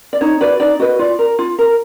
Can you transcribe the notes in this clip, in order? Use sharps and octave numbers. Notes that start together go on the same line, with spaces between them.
D5
D#4 C#5
F#4 B4 D5
D#4 D5
F#4 B4 D#5
F4 D5
A#4
F4
A#4